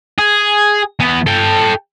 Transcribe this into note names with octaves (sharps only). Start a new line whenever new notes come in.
G#4
E2 B3
A4 G5